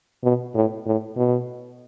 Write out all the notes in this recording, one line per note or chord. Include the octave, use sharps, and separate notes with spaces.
B2
A2
A2
B2